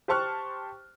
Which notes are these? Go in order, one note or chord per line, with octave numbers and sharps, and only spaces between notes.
G4 C5 A5 C#6 F6 F#6